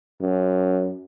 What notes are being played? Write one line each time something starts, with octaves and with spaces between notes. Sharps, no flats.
F#2